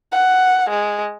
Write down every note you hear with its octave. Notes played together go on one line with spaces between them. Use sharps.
F#5
G#3